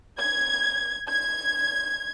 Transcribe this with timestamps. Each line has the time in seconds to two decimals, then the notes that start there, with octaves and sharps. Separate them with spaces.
0.18 G#6
1.08 G#6